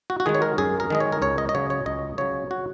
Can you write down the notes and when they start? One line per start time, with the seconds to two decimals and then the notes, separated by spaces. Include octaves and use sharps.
0.10 F#4
0.20 F#4
0.26 D#3 G#3 G#4
0.35 C#5
0.42 A#4
0.58 F#2 G#4
0.80 A#4
0.90 D#3 G#3 D#5
1.00 C#5
1.12 A#4
1.22 C#2 C#5
1.38 D#5
1.49 D#5
1.55 C#3 F#3 C#5
1.70 C#5
1.86 C#2 D#5
2.18 C#3 F#3 C#5
2.51 F#4